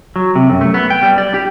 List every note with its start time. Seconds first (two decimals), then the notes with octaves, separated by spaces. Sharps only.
0.16 F#3
0.36 C3
0.50 F#2
0.61 A3
0.74 B3
0.90 G5
1.03 G3
1.18 D5
1.34 G4